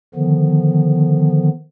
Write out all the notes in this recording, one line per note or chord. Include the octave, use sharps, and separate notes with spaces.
D3 D#3 F3 B3